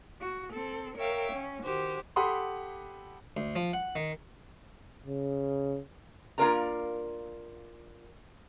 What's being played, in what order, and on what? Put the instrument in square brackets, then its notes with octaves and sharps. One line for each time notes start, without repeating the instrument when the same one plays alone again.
[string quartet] F#4
C4 A4
A#4 C#5 E5 F5 G5
C#4
D#3 F#4 G4 C5
[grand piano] G4 A4 F#5 B5 C6 D#6
[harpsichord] D2
F3
F#5
D#3
[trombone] C#3
[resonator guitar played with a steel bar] A#3 D4 F4 A#4 D5 A#5